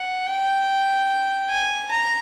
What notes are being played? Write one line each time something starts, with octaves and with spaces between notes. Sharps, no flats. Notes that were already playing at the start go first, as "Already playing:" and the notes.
Already playing: F#5
G5
G#5
A#5